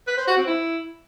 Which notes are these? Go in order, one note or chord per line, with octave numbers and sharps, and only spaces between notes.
B4
C5
F#4
C4
E4